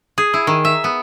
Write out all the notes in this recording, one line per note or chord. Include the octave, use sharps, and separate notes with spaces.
G#4
E4
D#3
E5
B3